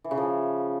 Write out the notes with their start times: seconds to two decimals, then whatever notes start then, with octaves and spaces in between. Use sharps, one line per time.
0.04 E3
0.11 C#3
0.17 F3